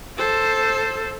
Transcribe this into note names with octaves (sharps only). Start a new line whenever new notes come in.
A4 C5